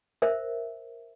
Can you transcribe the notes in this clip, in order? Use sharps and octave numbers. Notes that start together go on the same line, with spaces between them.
A#4 C5 E5